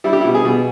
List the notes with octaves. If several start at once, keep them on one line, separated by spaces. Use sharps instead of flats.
G3 E4
G4
E4
B2
G#4
B2